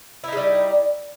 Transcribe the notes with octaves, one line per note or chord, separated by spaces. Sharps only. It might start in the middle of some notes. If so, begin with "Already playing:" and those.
G3 G#3 D#4 E4